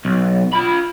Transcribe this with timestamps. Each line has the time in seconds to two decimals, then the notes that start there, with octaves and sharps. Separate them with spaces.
0.05 B1
0.53 F4 B5